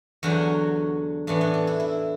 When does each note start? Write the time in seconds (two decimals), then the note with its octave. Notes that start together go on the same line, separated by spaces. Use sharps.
0.23 E2 D3 F#3 F#4
1.27 A2 E3 B3 D4
1.41 D4
1.54 D4
1.67 E4
1.80 E4